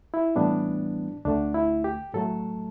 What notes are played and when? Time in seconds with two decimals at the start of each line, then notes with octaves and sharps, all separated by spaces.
0.14 E4
0.36 A2 E3 G3 B3 D4
1.25 D2 D3 A3 D4
1.54 E4
1.84 G4
2.14 A2 F#3 A3 A4